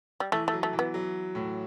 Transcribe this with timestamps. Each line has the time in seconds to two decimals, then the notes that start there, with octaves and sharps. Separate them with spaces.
0.20 G3
0.32 E3 A3
0.48 A3
0.53 F#3
0.63 A3
0.73 E3
0.79 B3
0.94 F#3
1.35 A2